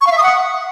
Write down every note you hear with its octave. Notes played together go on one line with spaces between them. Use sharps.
C#6
F5
E5
D#6
F#5